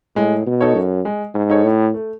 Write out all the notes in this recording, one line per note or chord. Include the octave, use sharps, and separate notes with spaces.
A2 G#3
B2
D#4 A4 C#5
F#2
G#3
G#2
D#4 A4 C#5
A2
A3